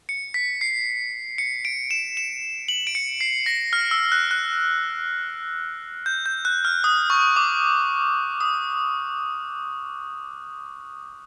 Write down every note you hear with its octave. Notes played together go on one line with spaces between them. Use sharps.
C#7
B6
C7
C#7
D7
E7
E7
F#7
D7
C#7
C7
A#6
F6
E6
F#6
F#6
G6
G6
F#6
F6
D#6
C#6
D6
D#6